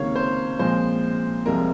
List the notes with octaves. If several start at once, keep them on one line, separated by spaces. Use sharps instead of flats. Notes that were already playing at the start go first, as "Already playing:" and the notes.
Already playing: C#2 C3 D#3 A#3 C#5 F5
C5
A#2 F3 G#3 C4 C5
C2 C3 F3 G#3 C4 A#4